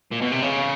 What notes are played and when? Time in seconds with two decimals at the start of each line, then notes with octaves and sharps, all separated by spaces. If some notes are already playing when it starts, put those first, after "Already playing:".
0.11 A#2
0.21 B2
0.32 C3
0.42 C#3